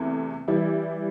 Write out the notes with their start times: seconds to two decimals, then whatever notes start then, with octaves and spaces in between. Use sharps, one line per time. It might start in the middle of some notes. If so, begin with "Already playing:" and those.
Already playing: E2 C3 A3 E4
0.48 E3 G3 E4 G4